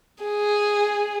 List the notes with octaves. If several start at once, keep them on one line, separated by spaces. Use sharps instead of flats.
G#4